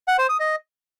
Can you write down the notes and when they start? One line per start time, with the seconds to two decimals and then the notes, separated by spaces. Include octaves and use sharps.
0.08 F#5
0.18 C5
0.29 D#6
0.40 D#5